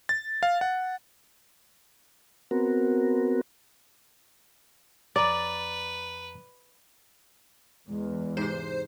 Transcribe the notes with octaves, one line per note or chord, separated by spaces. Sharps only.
A6
F5
F#5
B3 C4 F#4 A#4
F2 B4 D5 A#5 A6
E2 G#3
G#2 C3 C5